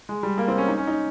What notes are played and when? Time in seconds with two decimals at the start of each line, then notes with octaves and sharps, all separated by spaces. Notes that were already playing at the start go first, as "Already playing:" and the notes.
0.09 G#3
0.23 G3
0.38 A#3
0.48 C4
0.58 C#4
0.68 D#4
0.77 C#4
0.87 D#4